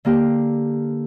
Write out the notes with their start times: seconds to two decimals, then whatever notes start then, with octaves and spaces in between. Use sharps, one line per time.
0.05 D3 A#3 G4